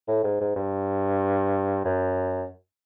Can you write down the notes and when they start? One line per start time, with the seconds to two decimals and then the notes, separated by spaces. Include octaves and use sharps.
0.08 A2
0.24 G#2
0.41 G#2
0.56 G2
1.85 F#2